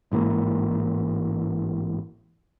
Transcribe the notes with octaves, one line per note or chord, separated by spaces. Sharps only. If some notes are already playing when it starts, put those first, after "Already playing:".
A1 G#2 E3 A#3